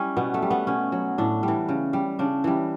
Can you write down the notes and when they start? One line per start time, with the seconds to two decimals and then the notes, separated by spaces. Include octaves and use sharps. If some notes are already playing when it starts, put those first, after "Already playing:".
Already playing: G3 C#4 E4
0.17 B2 B3
0.34 A3
0.42 G3
0.51 B3
0.67 B2 C#4
0.92 F#3
1.18 A2 D4
1.43 E3 G3
1.69 C#3
1.93 G3
2.19 C#3 D4
2.44 E3 G3